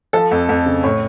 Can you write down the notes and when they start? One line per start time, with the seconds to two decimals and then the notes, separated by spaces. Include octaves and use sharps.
0.13 F3 A4
0.31 F2
0.49 F2
0.66 C#3
0.83 A2 C#5